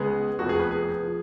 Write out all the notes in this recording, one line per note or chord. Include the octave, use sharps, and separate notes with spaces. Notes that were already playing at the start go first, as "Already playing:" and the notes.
Already playing: C#2 C#3 G#3 B3 G#4
F1 F2 F3 B3 F#4
G#4
B4
G#4
F3